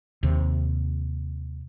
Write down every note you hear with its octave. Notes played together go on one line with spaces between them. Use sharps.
D#2 C3